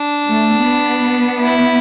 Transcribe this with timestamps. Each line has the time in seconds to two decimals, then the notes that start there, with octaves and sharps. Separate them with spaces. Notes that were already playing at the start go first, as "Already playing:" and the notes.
Already playing: D4
0.28 A3
0.65 B3
1.41 E4